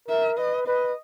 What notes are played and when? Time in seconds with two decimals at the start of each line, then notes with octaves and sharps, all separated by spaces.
0.08 A#4 E5
0.38 B4 D#5
0.67 B4 D#5